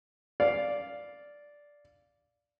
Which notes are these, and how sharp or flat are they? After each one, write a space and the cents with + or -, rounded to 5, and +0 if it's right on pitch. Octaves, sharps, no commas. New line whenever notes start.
D5 -5 F5 +0